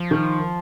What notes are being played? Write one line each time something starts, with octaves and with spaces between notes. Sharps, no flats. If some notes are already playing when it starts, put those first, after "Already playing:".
Already playing: F3
D#3